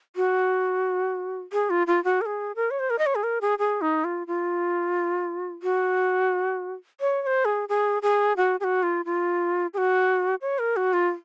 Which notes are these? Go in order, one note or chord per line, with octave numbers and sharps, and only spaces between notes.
F#4
G#4
F4
F4
F#4
A#4
G#4
A#4
C#5
C5
A#4
D#5
C#5
G#4
A#4
G#4
G#4
D#4
F4
F4
F#4
C#5
C#5
C5
G#4
G#4
G#4
F#4
G#4
F#4
F4
F4
G#4
F#4
C#5
A#4
F#4
F4